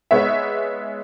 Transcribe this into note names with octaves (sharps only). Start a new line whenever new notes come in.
G#3 B3 D#4 C#5 E5